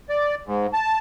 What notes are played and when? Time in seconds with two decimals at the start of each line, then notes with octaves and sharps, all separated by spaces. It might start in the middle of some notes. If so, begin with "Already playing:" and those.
0.09 D5
0.46 G#2
0.74 A5